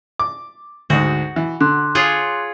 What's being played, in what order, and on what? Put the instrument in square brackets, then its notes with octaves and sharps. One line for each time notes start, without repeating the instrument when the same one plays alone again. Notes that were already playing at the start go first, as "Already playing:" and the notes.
[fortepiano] D6
[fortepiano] D2 G#2 [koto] F#4
[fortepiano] E3
[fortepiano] D3 [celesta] C6 D6 F#6
[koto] F4 G#4 C#5